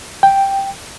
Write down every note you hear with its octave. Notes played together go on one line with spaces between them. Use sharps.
G5